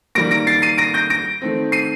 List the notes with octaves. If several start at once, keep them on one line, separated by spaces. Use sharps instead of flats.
D#3 G3 A#3 A#6 D7
A#6 D7
A6 C7
C7 D#7
A#6 D7
G6 A#6
A#6 D7
D#3 A3 C4
C7 D#7